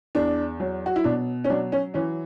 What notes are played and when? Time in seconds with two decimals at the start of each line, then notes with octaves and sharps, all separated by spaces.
0.15 E2 D4
0.60 F#3
0.86 F#4
0.96 E4
1.04 B2 D4
1.44 C#4
1.50 F#3 D4
1.72 C#4
1.94 E3 C#4